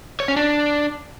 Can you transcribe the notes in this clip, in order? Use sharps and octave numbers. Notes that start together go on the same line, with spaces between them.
C#5
C#4
D4